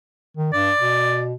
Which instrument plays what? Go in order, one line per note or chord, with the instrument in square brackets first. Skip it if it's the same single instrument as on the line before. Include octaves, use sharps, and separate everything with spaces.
[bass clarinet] D#3
[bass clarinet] G2 [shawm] D5
[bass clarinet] B2